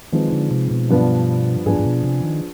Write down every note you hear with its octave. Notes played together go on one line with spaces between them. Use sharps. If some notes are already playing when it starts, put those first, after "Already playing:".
D#3 F3 G#3 C4 D#4 B4
D3
C3
B2
G2 F3 B3 D4
G#2 F3 B3 D4 G#4
G#2
B2
C3
D#3